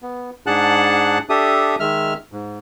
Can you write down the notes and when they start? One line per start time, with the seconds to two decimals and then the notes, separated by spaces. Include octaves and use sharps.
0.03 B3
0.47 G#2 D4 G#4 F#5 A5 F#6
1.30 D4 G4 A4 E5 D#6
1.80 D#3 G#3 E5 F6
2.32 G#2